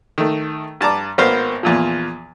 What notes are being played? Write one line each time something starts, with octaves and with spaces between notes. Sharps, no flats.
D#3 A3
G2 A5 A#5 D6
G#1 A#3 B3 C5 F5
E2 A#2 F3